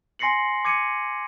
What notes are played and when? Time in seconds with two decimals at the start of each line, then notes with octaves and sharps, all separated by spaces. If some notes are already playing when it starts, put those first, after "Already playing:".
0.19 G#5 C6 A#6 C7 C#7 F#7
0.65 D6 G#6 C#7 D#7